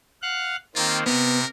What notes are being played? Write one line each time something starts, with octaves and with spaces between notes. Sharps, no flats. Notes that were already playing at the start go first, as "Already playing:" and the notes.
F5 F#5 F#6
D#3 A#3 C4 F4
C3 B3 A#4